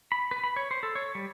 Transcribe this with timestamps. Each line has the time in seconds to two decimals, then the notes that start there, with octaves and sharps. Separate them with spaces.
0.12 B5
0.31 B4
0.44 B5
0.56 C#5
0.71 C5
0.83 A4
0.96 C#5
1.15 G3